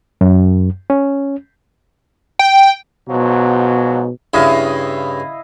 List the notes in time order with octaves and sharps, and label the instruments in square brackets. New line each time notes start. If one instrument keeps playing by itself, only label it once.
[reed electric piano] F#2
C#4
[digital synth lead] G5
[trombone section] G#2 F3 F#3 [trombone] B2
[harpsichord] G2 C#3 [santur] E4 D#5 F5